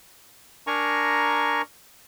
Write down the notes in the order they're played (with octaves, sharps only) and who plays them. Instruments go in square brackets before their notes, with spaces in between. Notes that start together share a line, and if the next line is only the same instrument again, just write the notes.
[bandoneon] D4 A#4 G#5 A#5 C#6